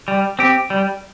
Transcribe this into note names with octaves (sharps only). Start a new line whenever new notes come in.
G3
C4 G4
G3